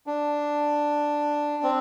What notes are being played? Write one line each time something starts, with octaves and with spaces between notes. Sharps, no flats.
D4
C4